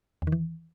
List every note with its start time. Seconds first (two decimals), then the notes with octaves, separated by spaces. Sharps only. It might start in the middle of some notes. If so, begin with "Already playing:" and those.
0.22 E2
0.27 D#3
0.32 E3